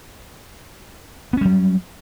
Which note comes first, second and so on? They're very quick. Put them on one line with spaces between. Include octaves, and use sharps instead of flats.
B3 C#4 G3 F#3